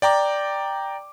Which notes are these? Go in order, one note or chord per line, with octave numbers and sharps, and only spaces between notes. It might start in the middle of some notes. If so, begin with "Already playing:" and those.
D5 G5 A#5 D6